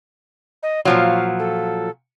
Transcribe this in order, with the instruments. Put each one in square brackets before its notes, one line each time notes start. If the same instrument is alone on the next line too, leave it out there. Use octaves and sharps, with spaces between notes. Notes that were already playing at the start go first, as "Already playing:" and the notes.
[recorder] D#5
[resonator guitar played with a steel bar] A#2 F3 F#3 [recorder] F5
[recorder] A4